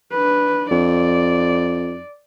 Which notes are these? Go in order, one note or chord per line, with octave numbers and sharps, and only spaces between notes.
D4 B4
F2 D5